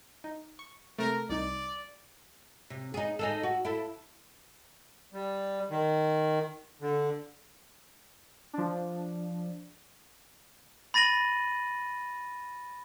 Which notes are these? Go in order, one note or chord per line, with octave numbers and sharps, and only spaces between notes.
D#4
C#6
C3 A3 A#4
C2 D#4 D5
C3
D#4 G#4
D#4 G#4 A4
F#4
E4 A4
G3
D#3
D3
F3 D4
B5 A6 A#6 D#7 F#7